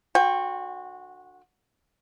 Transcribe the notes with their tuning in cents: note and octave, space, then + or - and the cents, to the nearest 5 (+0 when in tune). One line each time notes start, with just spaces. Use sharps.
D3 +25 F#4 -15 G5 +25